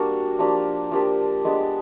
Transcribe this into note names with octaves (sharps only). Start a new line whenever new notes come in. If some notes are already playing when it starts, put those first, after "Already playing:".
Already playing: G3 A#3 D4 F#4
F3 A#3 D4 G4
F3 A#3 D4 G4
G#3 B3 D4 G4